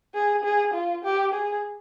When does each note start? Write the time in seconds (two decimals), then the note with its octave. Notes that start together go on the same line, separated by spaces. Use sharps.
0.15 G#4
0.44 G#4
0.74 F4
1.05 G4
1.34 G#4